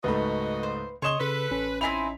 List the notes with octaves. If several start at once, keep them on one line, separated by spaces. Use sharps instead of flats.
C#2 G#2 A3 F#4 B4 D#5 B5
C5
C#3 C#5 D#5 C6 E7 G7
C#3 A4 B4
A1 C#4
C4 D#4 E4 G#5 B5 B6 F7